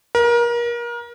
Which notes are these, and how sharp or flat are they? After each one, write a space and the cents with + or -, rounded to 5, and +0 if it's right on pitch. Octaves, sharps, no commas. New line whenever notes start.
A#4 +30